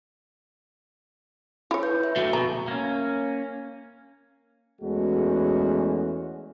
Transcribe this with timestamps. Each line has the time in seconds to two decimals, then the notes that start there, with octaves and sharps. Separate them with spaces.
1.71 E4 C#5
1.83 B4 G6
2.04 E5
2.16 F2 D3 A3 F#4
2.33 B2 A#5
2.68 A#3 C#4
4.81 E2 G#3 A3 C#4 F#4